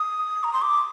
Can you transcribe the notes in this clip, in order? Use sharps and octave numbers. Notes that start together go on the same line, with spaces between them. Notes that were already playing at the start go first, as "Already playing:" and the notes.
Already playing: D#6
A#5
C6
D6